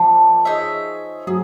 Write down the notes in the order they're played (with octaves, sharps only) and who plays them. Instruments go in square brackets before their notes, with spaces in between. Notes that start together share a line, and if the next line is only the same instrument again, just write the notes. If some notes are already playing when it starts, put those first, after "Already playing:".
Already playing: [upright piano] F3 [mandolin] A#3 D4
[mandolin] D#4 G#4 C#5 E5
[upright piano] F#3 [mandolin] G#4